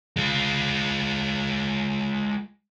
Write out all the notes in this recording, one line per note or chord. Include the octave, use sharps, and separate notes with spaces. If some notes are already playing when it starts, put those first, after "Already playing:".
G#3 F4